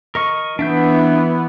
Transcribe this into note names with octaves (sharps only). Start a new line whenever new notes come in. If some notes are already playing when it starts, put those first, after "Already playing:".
A#4 D#5 C#6
E3 B3 D4 E5 G6